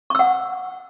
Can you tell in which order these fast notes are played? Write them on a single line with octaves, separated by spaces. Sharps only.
C#6 E6 F#5